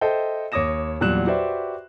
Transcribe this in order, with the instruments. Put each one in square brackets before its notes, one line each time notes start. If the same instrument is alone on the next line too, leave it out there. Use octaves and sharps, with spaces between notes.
[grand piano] A4 C5 D#5 E5 G5
D#2 C#5 D6 D#6 A#6 E7
E2 A#2 F#3 G3 F#6 E7
F#4 G4 B4 C5 D5 E5